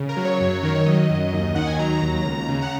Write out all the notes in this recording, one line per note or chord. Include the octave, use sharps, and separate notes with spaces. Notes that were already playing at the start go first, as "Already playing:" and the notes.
Already playing: C#3
A#4
F#3
C#5
F#2
D#3 A#4
C#5
F#3 D#5
F#2
D#2
D#3 F#5
G#5
F#3 A#5
D#2
C#2
C#3
F#5